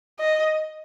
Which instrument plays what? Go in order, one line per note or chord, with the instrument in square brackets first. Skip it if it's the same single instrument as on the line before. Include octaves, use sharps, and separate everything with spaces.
[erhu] D#5